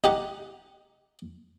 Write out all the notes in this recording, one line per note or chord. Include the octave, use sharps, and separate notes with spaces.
D#4 G4 F#5